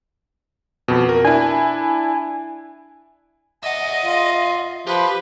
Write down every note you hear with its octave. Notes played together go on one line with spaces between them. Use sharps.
F2 B2
A#4
D4 E4 G#5
D#5 E5 F#5
F4
F3 G4 B4